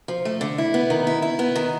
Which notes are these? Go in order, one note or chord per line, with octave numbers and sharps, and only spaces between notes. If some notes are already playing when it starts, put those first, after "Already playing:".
F3
A3
D3
E4
B3
D#3
E4
E4
B3
D#3